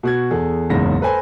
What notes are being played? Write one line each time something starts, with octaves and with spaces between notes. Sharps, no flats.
B2 F#4 G#6
E2 G#4 A4
F#1 E2 G#2 C#3 A#6
A4 B4 C5 G#5